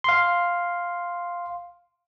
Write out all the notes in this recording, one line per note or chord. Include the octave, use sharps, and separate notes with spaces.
F5 C6